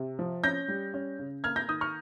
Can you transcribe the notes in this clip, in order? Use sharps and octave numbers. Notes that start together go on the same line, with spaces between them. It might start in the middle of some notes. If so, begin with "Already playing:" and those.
Already playing: C3
F3
C#4 G6 A#6
G3
C#4
C#3
A#3 F6 G#6
G6 A#6
D#3 D#6 G6
C#6 F6